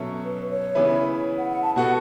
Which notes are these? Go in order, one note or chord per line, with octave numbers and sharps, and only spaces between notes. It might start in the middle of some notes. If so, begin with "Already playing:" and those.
Already playing: B2 F#3 C#4 A4 E5
B4
C#5
C#3 E3 B3 E4 B4
F#5
F#5
A5
B2 B3 F#4 A4 F#5